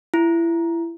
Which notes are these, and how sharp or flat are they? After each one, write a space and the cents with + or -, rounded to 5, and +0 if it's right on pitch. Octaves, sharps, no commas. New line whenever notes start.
E4 +25